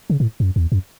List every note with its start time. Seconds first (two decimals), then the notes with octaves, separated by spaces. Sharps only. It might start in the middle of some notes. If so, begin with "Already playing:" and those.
0.10 C#3
0.20 A2
0.40 F#2
0.56 E2
0.72 F#2